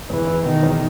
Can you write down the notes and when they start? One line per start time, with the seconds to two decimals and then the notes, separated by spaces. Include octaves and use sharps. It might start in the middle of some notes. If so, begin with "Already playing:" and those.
0.09 E2 E3
0.27 E2
0.46 B2 D#3
0.63 E2